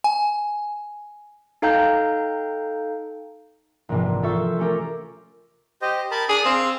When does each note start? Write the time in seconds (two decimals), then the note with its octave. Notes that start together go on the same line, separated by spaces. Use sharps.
0.04 G#5
1.62 D#4 A4 F5 G5 A#5 G6
3.89 A#1 G#2 C3 E3
4.23 F4 A4 C5 E5 C#6 E6
4.59 A3 C#4 G4 A#4
5.82 G4 C5 D#5
6.11 A#4 A5 B5
6.29 D4 G#4 D6
6.45 C4 F5 E6